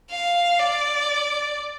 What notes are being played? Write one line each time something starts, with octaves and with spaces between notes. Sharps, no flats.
F5
D5